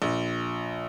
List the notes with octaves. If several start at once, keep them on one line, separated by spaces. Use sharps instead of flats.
A#1